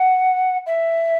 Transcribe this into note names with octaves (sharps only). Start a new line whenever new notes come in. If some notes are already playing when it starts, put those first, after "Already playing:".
Already playing: F#5
E5